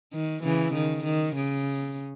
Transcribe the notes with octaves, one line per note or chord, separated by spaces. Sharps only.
D#3
C#3 E3
D#3
D#3
C#3